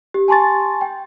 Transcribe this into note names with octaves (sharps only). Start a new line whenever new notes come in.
G4
G#5 A5 C6 C#6 A6
G5